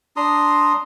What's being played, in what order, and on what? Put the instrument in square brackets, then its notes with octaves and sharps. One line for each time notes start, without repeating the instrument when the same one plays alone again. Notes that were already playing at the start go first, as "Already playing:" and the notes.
[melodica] D4 A#5 C6 D#6